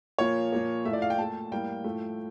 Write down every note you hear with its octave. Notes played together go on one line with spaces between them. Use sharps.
A#2 F3 A#3 C#5
A#2 F3 A#3
A2 F3 A3 E5
D5
F5
G5
A#2 A3 A5
A2 G3 A#3 G5
A2 F3 A3